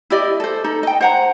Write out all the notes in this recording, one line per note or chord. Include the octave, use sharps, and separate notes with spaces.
E4 G4 D5 D#5
A4 C5
D#4 A4
D#5 G5
C5 F#5 A#5